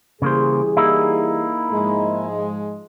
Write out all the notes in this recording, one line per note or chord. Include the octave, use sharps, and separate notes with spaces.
C#3 E3 G3 A#3 G#4 C5
A#3 D#4 E4
G#2 F3 G#3